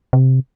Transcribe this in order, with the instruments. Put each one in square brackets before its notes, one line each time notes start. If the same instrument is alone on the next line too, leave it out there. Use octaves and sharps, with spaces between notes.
[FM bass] C3